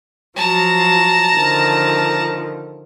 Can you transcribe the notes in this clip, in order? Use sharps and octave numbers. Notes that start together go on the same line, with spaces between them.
F3 F#3 A5 A#5
D3 D#3 F3